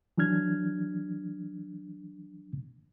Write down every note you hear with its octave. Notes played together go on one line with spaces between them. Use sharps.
E3 F#3 D4 F6 G#6